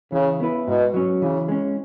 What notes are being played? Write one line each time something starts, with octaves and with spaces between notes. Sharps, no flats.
C#3 E3
B3 E4 B4
G#2 B2
F#3 C#4
C#3 E3
G#3 C#4